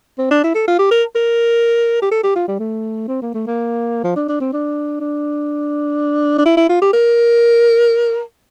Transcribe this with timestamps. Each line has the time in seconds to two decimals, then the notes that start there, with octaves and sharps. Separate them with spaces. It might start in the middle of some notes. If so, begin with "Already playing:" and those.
0.19 C4
0.31 D4
0.44 E4
0.55 A4
0.68 F4
0.79 G4
0.91 A#4
1.16 A#4
2.02 G4
2.11 A4
2.24 G4
2.36 F4
2.48 G3
2.59 A3
3.08 C4
3.22 A#3
3.34 A3
3.47 A#3
4.04 F3
4.16 D4
4.29 D4
4.40 C4
4.53 D4
5.01 D4
6.38 D4
6.45 E4
6.57 E4
6.69 F4
6.82 G4
6.93 A#4